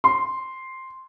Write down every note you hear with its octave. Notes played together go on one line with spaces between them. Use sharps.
C6